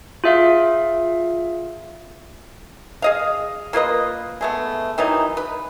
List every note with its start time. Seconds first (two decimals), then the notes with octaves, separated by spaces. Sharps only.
0.24 F4 G#4 E5 F5
3.02 G#4 D#5 F5
3.73 A#3 F4 B4 D#5
4.41 G#3 A3 B3
4.98 D#3 E3 F#3 D#4
5.37 B4